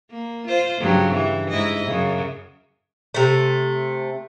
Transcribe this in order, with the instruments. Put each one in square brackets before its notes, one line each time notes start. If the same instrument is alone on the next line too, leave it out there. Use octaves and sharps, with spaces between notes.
[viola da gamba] A#3
F4 C5
G2 C#3 F#3
E3
G#2 E4 D#5
F#2 C#3
[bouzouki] C3 A3